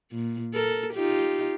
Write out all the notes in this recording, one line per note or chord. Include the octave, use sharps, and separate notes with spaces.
A#2
A4 A#4
D#4 F4 G4